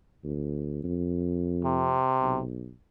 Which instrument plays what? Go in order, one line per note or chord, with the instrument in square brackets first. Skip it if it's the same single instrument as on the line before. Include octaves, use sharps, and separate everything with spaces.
[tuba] D2
F2
[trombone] C3
[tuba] B1